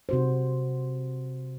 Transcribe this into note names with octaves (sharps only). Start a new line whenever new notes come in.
C3 F#4 C5